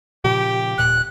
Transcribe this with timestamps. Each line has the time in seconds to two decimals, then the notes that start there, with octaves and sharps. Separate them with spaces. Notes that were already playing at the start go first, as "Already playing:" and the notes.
0.24 A#2 C#3 F3 G4
0.78 D#1 A#2 F#6